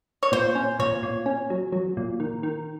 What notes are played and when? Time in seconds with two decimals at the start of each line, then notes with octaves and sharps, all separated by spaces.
0.23 C#5
0.32 A#2 C5
0.55 C#4
0.79 A#2 C#5
1.03 A#2
1.26 C#4
1.50 F#3
1.72 F#3
1.97 A#2
2.20 D#3
2.43 D#3